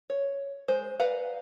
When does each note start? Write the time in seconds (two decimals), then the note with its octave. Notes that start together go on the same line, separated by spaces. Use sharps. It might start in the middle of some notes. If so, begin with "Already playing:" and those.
0.10 C#5
0.68 G#3 C5
1.00 B4 D5 F5 F#5 A#5